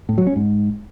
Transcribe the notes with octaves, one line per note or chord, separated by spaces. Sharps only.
A2
F#3
C#4
G#2